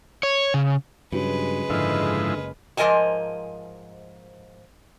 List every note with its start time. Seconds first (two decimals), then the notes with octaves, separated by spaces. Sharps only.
0.23 C#5
0.54 C#3
1.12 G2 C#3 F#3 G#3 B4
1.70 F#1 G#2 D3 F3 E4 D#5 F6
2.77 G#2 F3 A#4 D#5 G#5 A5